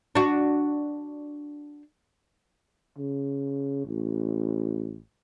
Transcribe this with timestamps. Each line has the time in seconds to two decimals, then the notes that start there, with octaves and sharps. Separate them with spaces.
0.15 D4 F#4
2.98 C#3
3.86 A1